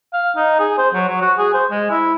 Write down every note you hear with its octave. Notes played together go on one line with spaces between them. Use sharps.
F5
D#4
G#4
C5
F#3
F#3
F#4
G#4
C5
G#3
E4